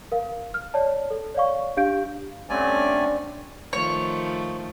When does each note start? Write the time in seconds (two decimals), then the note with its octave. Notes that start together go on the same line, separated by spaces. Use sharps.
0.12 A#4 F5
0.54 F6
0.74 C#5 D5 A5
1.10 A4
1.35 C#5 D5 F5 C#6
1.77 D4 G4 F5 G6 D7
2.50 G2 D3 A3 C4 C#4 D5 G#5
3.73 D#3 F3 A3 C#5